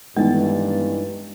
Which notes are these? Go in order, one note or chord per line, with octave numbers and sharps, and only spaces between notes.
G2 D#3 E3 G#3 A3 B3 A6